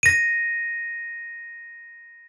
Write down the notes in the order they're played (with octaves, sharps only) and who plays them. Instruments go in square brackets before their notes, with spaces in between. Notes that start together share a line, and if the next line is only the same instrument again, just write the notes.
[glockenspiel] A#6 D#7